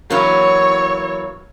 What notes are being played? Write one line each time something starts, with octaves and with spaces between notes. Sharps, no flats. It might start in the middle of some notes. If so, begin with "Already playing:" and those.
E3 F#3 A#3 C#5